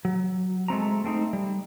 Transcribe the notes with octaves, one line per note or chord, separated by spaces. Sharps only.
F#3
G#3 A3 C4 A#5
A3 C4 C#4 D#4
G3